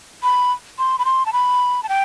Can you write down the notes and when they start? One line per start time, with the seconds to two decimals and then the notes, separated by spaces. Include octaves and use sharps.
0.23 B5
0.78 C6
0.99 B5
1.05 C6
1.26 A5
1.33 B5
1.83 A5
1.89 G5